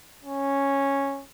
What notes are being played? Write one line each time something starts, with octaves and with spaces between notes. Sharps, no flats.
C#4